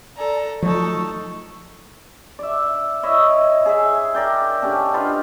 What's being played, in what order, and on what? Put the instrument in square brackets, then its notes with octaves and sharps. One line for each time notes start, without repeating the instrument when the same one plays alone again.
[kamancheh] A4 A#5 [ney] D5
[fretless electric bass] F3 F#3 A3 [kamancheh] D#4 A4 [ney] C#6
[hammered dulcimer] D5 E5
E4 C#5 D#5 E5
G#4 E5
A#4 D5 G5
D3 C#4 G4
D#4 F4 B4 F5